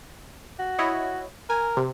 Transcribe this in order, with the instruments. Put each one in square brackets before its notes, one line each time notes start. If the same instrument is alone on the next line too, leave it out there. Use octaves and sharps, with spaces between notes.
[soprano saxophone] F#4
[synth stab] E4 C#5 D#5
[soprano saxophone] A#4 [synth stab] G#5
[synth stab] C3